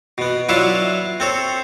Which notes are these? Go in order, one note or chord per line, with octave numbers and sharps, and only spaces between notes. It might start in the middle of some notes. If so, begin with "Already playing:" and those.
B2 B3
F#3 D4 E4 F4 C#5 E5
C4 A4 C#5